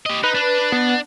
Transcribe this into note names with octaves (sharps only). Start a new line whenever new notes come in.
G4 D#5
D#4 B4
D4
B3